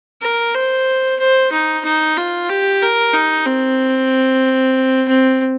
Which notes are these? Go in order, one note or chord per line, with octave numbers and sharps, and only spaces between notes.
A#4
C5
C5
D#4
D#4
F4
G4
A#4
D#4
C4
C4